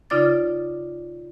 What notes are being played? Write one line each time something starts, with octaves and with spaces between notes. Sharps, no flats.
C#3 D#4 F4 D5 D6 A6